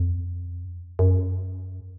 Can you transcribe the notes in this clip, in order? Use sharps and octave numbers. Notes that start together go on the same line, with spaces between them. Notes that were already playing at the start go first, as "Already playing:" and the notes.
Already playing: F2
F#2